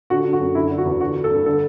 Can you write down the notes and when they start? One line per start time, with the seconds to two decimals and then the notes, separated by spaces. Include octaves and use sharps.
0.10 D3 F#4
0.25 D3
0.33 F#4
0.40 F#2
0.55 D3 E4
0.71 D3
0.78 F#4
0.86 E2
1.01 D3 F#4
1.16 D3
1.24 A4
1.31 G2
1.46 D3 A4